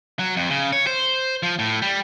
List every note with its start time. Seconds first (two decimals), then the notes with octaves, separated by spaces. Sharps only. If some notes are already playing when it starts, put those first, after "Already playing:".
0.19 F#3
0.36 F2
0.50 C#3
0.73 C#5
0.87 C5
1.43 F3
1.59 A2
1.82 G3